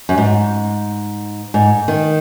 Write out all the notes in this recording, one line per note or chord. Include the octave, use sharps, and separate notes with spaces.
F#2
G#2
G#2
D#3